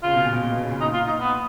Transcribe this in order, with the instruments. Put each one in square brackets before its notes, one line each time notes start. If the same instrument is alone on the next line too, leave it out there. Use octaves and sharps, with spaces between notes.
[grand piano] C#3 [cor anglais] F4
[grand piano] B2
A#2
B2
A#2
B2
C#3
A#2
[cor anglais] D#4
F4
D#4
B3